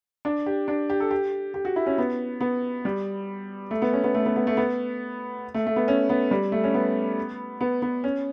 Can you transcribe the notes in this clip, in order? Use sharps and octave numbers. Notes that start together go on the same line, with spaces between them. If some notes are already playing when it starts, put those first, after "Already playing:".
D4
G4
D4
G4
A4
G4
G4
F#4
E4
C#4
B3
B3
G3
A3
B3
C#4
B3
A3
B3
B3
A3
B3
A3
A3
B3
C#4
B3
G3
A3
C#4
B3
B3
B3
C#4